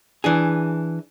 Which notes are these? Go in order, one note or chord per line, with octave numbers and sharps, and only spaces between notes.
E3 D4 G#4